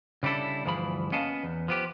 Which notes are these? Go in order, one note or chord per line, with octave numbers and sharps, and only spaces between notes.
C#3 G3 D4 E4 A4
D2 G2 E3 F3 G#4 B5
A#3 B3 C#4 D#5 F5 A5
E2
F3 B3 G4